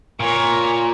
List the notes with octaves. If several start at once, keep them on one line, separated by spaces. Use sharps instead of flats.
A#2 A#4 C#5